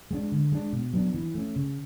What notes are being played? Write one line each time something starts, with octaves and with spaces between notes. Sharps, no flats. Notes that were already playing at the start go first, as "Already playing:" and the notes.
G#3 B3 D4
D3
G#3 B3 D4
B2
F#3 B3 D4
E3
A3 C#4
C#3